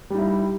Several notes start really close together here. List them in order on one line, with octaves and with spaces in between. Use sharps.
G3 D#4 E4